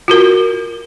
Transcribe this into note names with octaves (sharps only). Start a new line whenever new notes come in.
F4 F#4 A#4